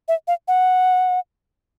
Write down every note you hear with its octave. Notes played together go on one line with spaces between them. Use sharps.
E5
F5
F#5